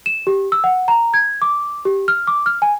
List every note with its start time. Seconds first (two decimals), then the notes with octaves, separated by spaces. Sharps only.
0.06 E7
0.27 G4
0.52 E6
0.64 F#5
0.88 A#5
1.14 G#6
1.42 D6
1.85 G4
2.08 F6
2.27 D6
2.46 F6
2.62 G#5